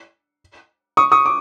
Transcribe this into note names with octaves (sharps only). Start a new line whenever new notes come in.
C#6 D#6
C#6 D#6
D6